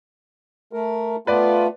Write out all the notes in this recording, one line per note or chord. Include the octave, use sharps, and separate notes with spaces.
A3 A#4
A3 B3 F4 B4 D5